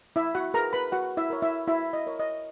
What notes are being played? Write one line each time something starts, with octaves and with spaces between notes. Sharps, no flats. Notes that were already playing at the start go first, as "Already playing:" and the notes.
E4 E5
F#4 F#5
G#4 A#4 B4 A#5
B4 B5
F#4 F#5
E4 E5
A#4 C#5
E4 E5
E4 F#4 E5
D#5
A#4 C#5
D#5